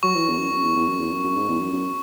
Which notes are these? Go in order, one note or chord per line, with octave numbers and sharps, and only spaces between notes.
F#3 C#6
E3
E2
F#2
F#2
E2
E2
F#2
E2
F#2
F#2
G#2
E2
F#2
F#2